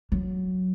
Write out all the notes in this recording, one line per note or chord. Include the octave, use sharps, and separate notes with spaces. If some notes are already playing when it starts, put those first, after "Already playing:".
F#3